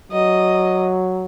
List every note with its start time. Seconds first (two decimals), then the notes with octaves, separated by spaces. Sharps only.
0.12 F#3 D#5